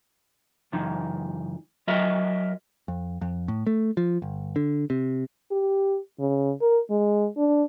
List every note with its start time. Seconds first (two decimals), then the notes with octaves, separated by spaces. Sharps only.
0.72 C#2 F#2 E3 D#4
1.87 F#3 F#4 A#4 D#5 E5
2.88 F2
3.21 F2
3.48 A2
3.67 A3
3.97 F3
4.22 G1
4.56 D3
4.90 C3
5.51 G4
6.19 C#3
6.61 A#4
6.90 G#3
7.37 D4